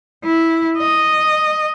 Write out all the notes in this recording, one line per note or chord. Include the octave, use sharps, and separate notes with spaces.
E4
D#5